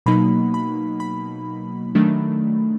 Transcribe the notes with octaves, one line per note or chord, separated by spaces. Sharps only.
B2 F#3 A#3 D#4 B5
B5
B5
D#3 F#3 A3 D4